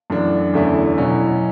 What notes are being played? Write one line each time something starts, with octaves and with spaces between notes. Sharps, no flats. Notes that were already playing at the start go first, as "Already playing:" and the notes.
F#2 E3 A3 D4
E2 D3 A3 C#4 E4
B2 F#3 C#4 E4